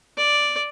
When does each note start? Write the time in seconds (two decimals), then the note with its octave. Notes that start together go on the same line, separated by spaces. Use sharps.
0.17 D5